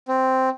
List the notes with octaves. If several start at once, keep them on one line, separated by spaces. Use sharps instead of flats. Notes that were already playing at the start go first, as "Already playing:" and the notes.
C4